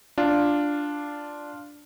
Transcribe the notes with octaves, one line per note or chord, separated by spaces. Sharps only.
D4 F4